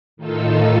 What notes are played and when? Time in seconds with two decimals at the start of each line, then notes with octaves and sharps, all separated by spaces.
0.17 A2 D#3 D#4 F4 A4 E6